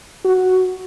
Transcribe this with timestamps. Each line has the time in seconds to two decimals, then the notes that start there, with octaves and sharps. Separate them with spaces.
0.25 F#4